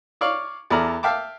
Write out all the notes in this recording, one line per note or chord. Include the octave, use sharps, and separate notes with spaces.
C#5 D5 F5 C#6
E2 A4 D5 A#5 F6
E5 F5 G5 A5 D6